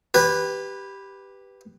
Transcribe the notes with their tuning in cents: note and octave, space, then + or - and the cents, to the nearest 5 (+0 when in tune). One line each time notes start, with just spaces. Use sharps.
G4 +0 B4 +0 G#5 -35